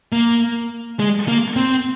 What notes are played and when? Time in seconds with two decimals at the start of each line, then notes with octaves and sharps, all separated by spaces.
0.12 A#3
0.99 G#3
1.28 A#3
1.56 C4